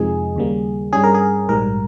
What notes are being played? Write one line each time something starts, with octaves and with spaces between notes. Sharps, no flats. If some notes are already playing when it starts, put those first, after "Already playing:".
Already playing: F2 C3 F3 G#3 D#4 G#4
D#2 C#3 G3 A#3
G2 G3 C#4 G#4
A#4
G#4
A#1 G#2 G3 A#4